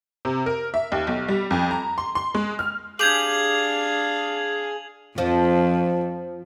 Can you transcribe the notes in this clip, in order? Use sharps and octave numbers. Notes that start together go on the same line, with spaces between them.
C3
A#4
E5
D#2
B1
G3
F2
A#5
C6
C6
G#3
F6
D4 G4 G#4 F5 G6 G#6 F7 F#7
F2 F3